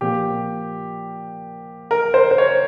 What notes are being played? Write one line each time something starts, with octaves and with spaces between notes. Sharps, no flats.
A#2 F3 A#3 G4
A#4
C5
C5
C#5